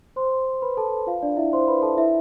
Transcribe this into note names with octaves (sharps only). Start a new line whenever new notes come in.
C5 C6
B4 B5
A4 A5
F4 F5
D4 D5
E4 E5
C5 C6
B4 B5
A4 A5
E4 E5